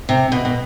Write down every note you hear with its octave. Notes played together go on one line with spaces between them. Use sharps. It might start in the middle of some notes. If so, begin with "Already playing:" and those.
C3
B2
B2